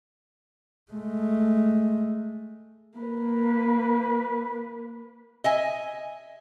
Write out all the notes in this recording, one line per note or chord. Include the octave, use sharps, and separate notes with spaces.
G#3 A3
A#3 B4
D#5 E5 G#5